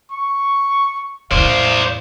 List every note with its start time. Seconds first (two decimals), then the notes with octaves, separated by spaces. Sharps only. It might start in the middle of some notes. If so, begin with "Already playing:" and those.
0.11 C#6
1.31 E2 A2 C5 D5 F5